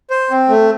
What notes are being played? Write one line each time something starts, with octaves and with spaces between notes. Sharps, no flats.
C5
C4
A3